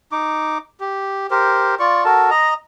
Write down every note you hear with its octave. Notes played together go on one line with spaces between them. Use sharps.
D#4 D6
G4
G4 A#4 C5
F4 D5 C#6
F#4 A4 A#4 A5
D#5 A#5